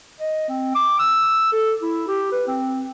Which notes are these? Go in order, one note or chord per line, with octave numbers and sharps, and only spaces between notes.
D#5
C4
D6
E6
A4
E4
G4
B4
C4